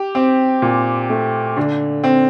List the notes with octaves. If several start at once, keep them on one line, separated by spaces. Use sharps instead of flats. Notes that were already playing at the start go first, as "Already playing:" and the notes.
Already playing: G4
C4
A#2
A3
D3
C4